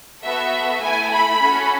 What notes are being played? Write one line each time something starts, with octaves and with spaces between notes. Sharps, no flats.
B3 F#4 A4 E5
A3 E4 A4 G#5
B5
C#4 F#4 A4